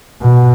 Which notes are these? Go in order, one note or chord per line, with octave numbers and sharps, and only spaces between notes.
B2